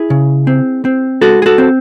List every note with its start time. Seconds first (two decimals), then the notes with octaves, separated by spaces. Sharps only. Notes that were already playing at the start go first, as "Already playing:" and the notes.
Already playing: E4 G#4
0.10 C#3
0.47 C4
0.85 C4
1.22 G#3 F#4 A4
1.42 G#4
1.46 F#4 A4
1.58 C4